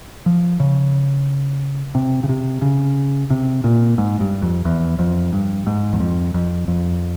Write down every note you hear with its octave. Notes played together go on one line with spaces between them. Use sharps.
F3
C#3
C3
C#3
C3
C#3
C3
A#2
G#2
G2
F2
E2
F2
G2
G#2
E2
F2
F2
F2